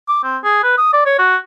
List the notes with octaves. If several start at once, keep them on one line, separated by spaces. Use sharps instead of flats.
D6
C4
G#4
B4
D#6
D5
C#5
F#4